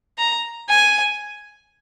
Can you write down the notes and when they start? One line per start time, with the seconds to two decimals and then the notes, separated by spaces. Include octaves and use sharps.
0.18 A#5
0.69 G#5